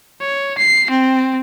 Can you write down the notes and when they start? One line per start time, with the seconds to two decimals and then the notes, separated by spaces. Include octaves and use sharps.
0.21 C#5
0.58 C7
0.90 C4